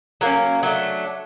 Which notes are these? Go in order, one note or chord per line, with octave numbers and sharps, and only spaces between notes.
F#3 A#3 C#4
F#3 A3 D4